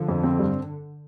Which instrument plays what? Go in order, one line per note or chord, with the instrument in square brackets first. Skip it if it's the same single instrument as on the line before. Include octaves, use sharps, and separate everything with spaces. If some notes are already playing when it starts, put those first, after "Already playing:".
Already playing: [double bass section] D3 [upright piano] F3
[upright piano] F2
C4
G2